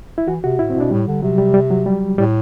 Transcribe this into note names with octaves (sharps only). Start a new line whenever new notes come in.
E4
E3 F#4
C3 F#4
A2 E4
C4
B2
D4
A2 G3
D3
C3 F#3
G3
G3
F#3
G3
A2 G3